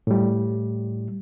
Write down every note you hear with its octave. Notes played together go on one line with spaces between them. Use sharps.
A2 G3